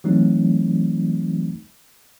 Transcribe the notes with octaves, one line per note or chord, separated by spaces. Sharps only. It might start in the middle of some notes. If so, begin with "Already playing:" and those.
E3 F#3 G3 A3 C4 D#4